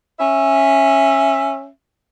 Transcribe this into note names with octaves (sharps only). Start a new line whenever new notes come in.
C#4 E5